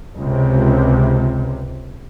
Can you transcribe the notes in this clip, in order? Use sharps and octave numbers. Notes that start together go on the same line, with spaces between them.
C#2 C3